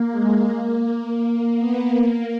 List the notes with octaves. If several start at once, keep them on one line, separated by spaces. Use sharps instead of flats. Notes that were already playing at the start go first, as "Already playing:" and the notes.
Already playing: A#3
G#3
A#3
B3
A#3